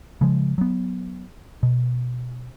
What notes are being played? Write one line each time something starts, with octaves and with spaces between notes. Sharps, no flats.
C#3 F3 G#3
F#3 B3
B2